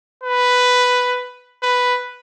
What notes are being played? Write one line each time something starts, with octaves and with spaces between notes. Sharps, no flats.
B4
B4